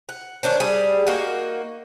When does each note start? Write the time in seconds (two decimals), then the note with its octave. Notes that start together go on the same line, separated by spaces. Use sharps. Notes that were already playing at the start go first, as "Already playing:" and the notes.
0.09 F#5
0.43 D#3 C#4 D4 C5
0.60 G3 G#4
1.07 A#3 D#4 F#4